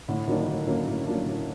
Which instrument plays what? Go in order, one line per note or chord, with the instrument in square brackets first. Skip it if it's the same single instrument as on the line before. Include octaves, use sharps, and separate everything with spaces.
[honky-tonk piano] A2 [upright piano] D3
[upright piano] D#3 [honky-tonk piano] F#3 A#3 D4
[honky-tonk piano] A2 [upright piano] D3
[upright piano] C#3 [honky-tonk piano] F#3 A#3 D4
[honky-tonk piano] A2
F#3 A#3 D4
A2